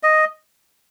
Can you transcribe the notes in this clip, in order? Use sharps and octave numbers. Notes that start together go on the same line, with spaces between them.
D#5